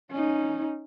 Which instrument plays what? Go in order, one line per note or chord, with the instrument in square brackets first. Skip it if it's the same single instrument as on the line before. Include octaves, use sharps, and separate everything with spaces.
[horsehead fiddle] C#4 D#4